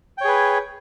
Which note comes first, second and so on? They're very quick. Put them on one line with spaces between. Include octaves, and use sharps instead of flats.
G5 C#5 G#4 B4